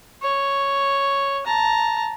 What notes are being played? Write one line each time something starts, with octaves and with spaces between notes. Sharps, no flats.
C#5
A5 A#5